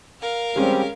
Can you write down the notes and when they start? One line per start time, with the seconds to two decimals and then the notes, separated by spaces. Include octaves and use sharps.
0.21 A#4 F5
0.56 G3 G#3 C4 C#4 G4